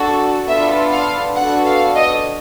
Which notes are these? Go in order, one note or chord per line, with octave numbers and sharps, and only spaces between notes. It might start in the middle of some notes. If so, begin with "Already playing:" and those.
Already playing: D4 F#4 A4
B3 D4 F4 A4 E5
F5
B3 D4 F#4 A4 F#5
F5
D#5